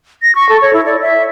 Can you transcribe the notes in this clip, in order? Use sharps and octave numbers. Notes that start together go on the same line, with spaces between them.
A#6
C#6
A4
C#5
E4
D5
E5